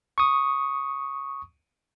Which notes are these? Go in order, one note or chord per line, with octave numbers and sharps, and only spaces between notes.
C#6 D#6